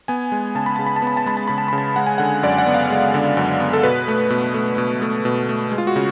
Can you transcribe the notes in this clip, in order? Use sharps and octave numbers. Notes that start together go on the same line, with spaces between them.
B3 G#5
G#3
C#3 A5
B5
C#3 A5
B5
A5
B3
B5
A5
G#3 B5
A5
C#3 B5
A5
C#3 B5
A5
G#3 F#5
G#5
D3 F#5
F#2 D5
F#5
B3
F5
G#3
D3
F#2
B3
A4
B2 B4
A3
B2
A3
B2
A3
B2
A3
G#3
F4
F#4
C#3